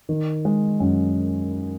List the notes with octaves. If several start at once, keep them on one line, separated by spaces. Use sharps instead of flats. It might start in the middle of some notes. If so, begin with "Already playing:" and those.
D#3
G#3
F#2